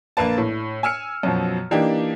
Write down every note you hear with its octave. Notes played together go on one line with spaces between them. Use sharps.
A#1 A#3 B4 A5
A2
G#5 E6 F6 C#7
F#2 B2 F3
E3 A#3 D4 D#4 G4